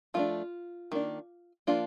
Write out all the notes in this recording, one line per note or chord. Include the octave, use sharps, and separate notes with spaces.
F3 A3 D4 F4
D#3 A#3 D4
F3 A#3 D4 F4